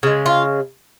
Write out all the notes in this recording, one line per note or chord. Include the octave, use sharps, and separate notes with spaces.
C#3 G#3
F4